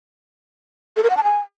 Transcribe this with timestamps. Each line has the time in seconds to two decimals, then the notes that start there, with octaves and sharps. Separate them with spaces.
0.96 A4
1.03 A#4
1.10 F#5
1.17 A5
1.23 G#5